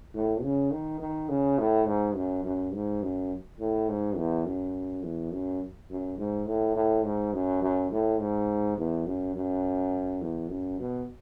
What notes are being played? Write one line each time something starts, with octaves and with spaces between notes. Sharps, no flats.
A2
C#3
D#3
D#3
C#3
A2
G#2
F#2
F#2
G#2
F#2
A2
G#2
E2
F#2
E2
F#2
F#2
G#2
A2
A2
G#2
F#2
F#2
A2
G#2
E2
F#2
F#2
E2
F#2
B2